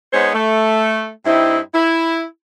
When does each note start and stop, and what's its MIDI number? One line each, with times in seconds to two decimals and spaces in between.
0.12 0.29 56
0.12 0.29 59
0.12 0.29 63
0.12 0.29 72
0.12 0.29 73
0.33 1.09 57
1.25 1.58 43
1.25 1.58 60
1.25 1.58 63
1.25 1.58 64
1.74 2.22 64